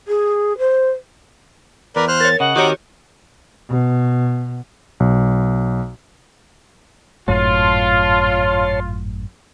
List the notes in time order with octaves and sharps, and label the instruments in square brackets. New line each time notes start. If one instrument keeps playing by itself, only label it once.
[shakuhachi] G#4
C5
[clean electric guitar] E2 [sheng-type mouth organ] A#4 B4 D5
[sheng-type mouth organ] C5 F6 F#6
[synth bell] A#4 C#5 [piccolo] A6
[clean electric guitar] C#3 [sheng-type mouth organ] D#5 [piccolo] F#5
[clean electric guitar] D#3 C4 A#4 [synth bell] F#4 G4 C#5 [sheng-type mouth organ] D#5 D6
[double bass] B2
[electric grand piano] B1
[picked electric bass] G#1 F#2 A2 [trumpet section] F4 [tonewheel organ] C#5 A5 C6